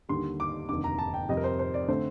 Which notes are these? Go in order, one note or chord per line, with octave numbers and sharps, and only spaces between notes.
D#2 D3 G3 C6
D6
F1 D#2 D3 D6
A#5
A5
G5
F2 C3 G3 C4 D#5
A#4
C5
C5
D5
D3 A3 C4 C5